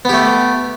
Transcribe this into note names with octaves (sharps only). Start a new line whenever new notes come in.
A3 B3 G4